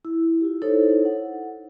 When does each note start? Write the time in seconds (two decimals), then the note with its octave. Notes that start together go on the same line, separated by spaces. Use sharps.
0.05 E4
0.41 F4 G4
0.62 D#4 E4 A4 C5 C#5
1.05 F#5